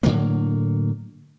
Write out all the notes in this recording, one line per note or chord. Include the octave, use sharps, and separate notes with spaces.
A2 D3 F#3 A#3